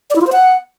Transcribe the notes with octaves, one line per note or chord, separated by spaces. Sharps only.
D5
E4
F4
C5
F#5